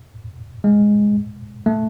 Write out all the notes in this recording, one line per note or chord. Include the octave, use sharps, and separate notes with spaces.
G#3
A3